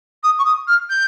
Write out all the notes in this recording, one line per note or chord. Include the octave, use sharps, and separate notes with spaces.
D#6
C#6
D#6
F6
G6